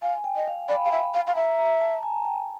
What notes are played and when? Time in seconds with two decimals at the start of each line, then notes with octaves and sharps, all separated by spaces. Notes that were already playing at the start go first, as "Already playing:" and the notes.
0.02 F5 G#5
0.24 G5
0.36 D#5
0.48 F5
0.69 D5 B5
0.85 F5
0.92 E5
1.03 B5
1.14 F5
1.27 F5
1.35 E5 A#5
1.59 A#5
1.81 A5
2.03 G#5
2.25 G5